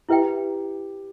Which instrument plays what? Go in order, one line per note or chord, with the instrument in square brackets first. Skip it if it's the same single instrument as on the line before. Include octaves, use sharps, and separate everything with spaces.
[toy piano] E4 B4 E5 G5 [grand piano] G4